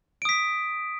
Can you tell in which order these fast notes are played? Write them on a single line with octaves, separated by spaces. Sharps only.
D7 D#6 B6